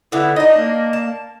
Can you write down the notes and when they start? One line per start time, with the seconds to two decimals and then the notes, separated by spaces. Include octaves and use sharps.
0.12 D3 B3 E4
0.36 D4 D#4 D#5
0.57 A#3
0.93 A5